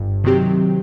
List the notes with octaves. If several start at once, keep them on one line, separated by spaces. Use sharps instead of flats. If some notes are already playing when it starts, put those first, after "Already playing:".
Already playing: G1 G2
C3 D#3 F#3 C4 G4